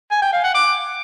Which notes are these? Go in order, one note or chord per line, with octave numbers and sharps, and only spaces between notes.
G#5
G5
F5
F#5
D6